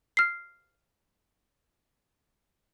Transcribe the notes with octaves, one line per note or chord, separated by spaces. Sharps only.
F6 C7